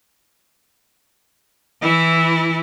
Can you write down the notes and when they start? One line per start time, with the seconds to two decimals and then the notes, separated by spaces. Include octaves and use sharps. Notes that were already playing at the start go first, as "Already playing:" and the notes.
1.82 E3 E4